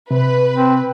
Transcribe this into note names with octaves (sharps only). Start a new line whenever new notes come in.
C3 B4
C4